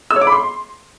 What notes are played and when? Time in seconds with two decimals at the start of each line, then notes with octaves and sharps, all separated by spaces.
0.11 E6
0.16 C#5
0.21 D6
0.27 B5
0.32 C6